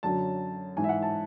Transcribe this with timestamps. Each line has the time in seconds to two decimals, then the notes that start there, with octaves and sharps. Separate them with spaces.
0.03 F#2 D3 F#3 A5
0.77 G#2 E3 G#5
0.84 E5
0.89 F#5
1.02 A5